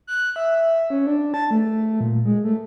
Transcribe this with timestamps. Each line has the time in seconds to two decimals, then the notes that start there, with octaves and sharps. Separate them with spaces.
0.07 F#6
0.36 E5
0.90 C#4
1.07 D4
1.34 A5
1.51 A3
2.01 A#2
2.25 G#3
2.44 A3